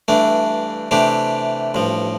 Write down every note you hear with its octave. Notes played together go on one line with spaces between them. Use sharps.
G2 E3 A3 D4
C3 E3 A3 D4 G4
A1 G2 F3